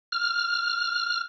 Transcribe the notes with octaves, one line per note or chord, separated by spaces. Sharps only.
F6